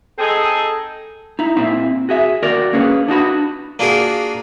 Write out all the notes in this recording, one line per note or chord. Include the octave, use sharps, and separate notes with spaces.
C4 D#4 G#4 A4
D#4 E4
A#2 C4 E4 E5
F#4 G#4 E5
D#2 F#4 A#4 D5
A#3 C#4 G#4 B4
D4 D#4 F#4 B5
A#3 D4 F4 F#4 G#4 A#4